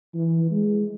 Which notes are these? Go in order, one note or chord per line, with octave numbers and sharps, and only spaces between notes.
E3
G#3